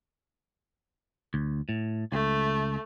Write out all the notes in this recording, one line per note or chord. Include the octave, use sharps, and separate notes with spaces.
D2
A2
C#2 A3